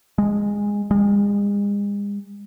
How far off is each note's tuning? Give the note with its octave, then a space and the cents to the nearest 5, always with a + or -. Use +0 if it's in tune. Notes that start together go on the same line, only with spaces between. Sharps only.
G#3 -15
G#3 -40